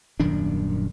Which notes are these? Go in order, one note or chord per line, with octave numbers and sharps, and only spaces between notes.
D#1 F#2 D#3 D4